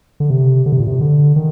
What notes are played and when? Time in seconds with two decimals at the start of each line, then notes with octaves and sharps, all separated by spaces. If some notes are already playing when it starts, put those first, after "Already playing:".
0.20 D3
0.30 C3
0.66 D3
0.72 C3
0.80 A#2
0.87 C3
1.01 D3
1.36 D#3